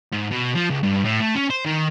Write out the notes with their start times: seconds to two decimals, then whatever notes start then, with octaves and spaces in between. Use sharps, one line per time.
0.13 G#2
0.32 B2
0.55 F3
0.70 C#2
0.83 G2
1.04 A2
1.20 A3
1.35 C#4
1.50 C5
1.65 D#3